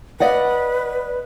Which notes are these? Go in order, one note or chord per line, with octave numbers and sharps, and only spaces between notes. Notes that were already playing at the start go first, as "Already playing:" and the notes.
B4 D5 D#5 F#5